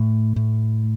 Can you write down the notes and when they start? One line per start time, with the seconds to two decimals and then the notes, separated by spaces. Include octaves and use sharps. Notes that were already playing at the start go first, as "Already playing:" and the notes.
Already playing: A2 A3
0.36 A2